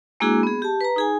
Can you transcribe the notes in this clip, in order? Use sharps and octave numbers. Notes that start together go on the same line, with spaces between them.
G#3 A#3 D4 E4 F#4 G#4
B3 G#4
G4 A5
B4 A#5
D#4 G#4 G#5